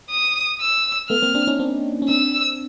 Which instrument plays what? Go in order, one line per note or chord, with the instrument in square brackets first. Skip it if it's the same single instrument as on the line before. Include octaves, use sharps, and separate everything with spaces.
[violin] D#6
E6
[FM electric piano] A3 B3 [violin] F6
[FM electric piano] A#3 C4
C4 D4
C#4 D#4
C4 D4
C#4
[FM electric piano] C4 D4 [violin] E6